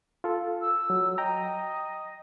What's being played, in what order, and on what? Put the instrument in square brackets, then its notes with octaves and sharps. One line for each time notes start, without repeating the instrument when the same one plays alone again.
[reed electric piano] F4 A4
[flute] E6
[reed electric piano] F#3
[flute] D#5 [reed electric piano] G5 A#5